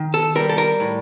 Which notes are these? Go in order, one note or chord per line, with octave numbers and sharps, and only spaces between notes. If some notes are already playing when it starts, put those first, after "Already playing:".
Already playing: D#3
A4
G3 A#4
A4
A#4
A2